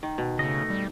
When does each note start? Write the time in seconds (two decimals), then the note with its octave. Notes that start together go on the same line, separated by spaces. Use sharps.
0.03 D#3
0.18 B2
0.39 C#3 A3 D#5
0.70 G3